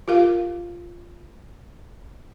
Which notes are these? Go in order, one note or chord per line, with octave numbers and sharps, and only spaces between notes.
F4 G4 A#4 F5